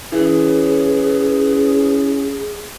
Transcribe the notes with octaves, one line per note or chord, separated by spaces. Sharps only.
E3 C#4 G#4 B4